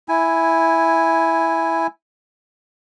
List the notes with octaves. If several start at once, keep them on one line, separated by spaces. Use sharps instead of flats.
E4 G#5